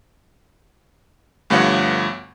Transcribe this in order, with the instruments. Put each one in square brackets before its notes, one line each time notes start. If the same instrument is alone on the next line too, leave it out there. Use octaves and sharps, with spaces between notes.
[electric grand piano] D2 G2 F3 B3 C#5 F#5